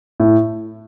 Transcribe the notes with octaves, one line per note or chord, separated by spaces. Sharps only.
A2